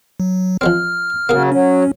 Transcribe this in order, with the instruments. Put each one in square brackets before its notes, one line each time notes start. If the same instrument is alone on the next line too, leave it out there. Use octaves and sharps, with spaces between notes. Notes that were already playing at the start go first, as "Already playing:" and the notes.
[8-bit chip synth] F#3
[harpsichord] F3 G#3 C4 [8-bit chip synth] F6
[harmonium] C#3 F#3 [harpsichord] A#3 G#4
[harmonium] F#3 [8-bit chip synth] C#4